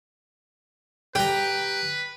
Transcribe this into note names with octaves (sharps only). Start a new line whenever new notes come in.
G4 B4 G5 A#5